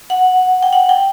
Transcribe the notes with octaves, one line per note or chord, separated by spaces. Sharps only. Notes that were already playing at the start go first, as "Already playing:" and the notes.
F#5
G5
F#5
G5